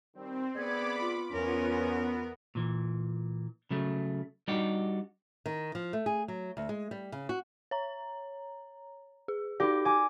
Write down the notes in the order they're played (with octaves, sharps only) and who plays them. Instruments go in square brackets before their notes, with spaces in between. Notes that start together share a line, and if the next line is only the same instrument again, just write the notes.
[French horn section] D#3 G3 [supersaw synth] C4
[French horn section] D2 G#4 D5 [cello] B3 [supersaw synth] B5 D6 [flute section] G#6
[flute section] F4
[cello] E2 A#4 [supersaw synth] B3 [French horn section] C#4
[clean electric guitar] A#2 E3
C#3 F#3 A3
G3 D4 D#4 F#4 G4
[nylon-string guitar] D#3
F3
A3
G#4
F#3
D2
G#3
G3
C#3
F#4
[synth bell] C#5 A#5
G#4
[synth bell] D#4 F#4 D5 [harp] G4
[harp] G#5 D6